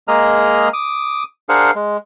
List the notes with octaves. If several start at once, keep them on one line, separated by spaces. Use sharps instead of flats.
G#3 A#3 G#4 D#5 A#5 F6
D6 D#6
D4 G#4 A#4 C5 F5 F#5
G#3